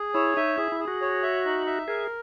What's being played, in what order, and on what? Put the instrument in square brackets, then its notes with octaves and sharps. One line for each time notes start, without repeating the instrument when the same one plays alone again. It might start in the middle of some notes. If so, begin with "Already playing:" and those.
Already playing: [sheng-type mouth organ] G#4
[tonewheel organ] E4 [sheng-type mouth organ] C#5
[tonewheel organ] D#4 [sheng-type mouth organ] E5
[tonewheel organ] E4 [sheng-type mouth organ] G#4
[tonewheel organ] E4
[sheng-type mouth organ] G#4
[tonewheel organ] F#4
[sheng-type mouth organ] C#5
E5
D#4
E5
[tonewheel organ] G#4 [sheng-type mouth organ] A#4